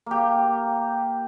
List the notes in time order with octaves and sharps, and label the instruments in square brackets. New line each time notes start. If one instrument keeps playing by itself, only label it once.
[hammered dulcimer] A#3 G4